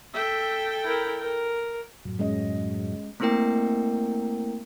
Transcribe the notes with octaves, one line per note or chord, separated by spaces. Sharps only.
A4 E5 G5
E4 A#4
A#4
F#2 A2 F#3
G#3 C#4 D#5
A3 A#3 C4 E4 A#4 G5